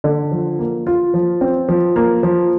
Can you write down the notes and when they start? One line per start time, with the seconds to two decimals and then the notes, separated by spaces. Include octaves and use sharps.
0.04 D3
0.31 F3
0.59 A#3
0.87 F4
1.14 F3
1.41 C4
1.68 F3
1.96 A#3
2.23 F3